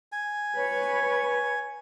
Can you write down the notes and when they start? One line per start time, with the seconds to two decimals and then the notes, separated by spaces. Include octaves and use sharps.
0.12 G#5
0.56 B4 C#5